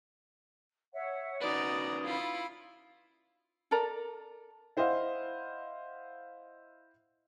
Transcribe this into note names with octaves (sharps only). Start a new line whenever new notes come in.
C#5 E5 F#5
C#4 D#4 F#4 B4 D5 A#5 D#6
E4 F4 B5
A4 A#4 D5 A#5
E4 C5 D#5 F5 F#5